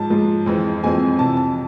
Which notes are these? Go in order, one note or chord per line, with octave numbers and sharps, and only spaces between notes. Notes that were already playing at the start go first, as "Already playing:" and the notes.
Already playing: G#2 F3 G#3 A5
G#2 F3 G#3
F2 E3 G#3 C4
F2 E3 G#3 C4 G#5
F2 C3 E3 A5
A5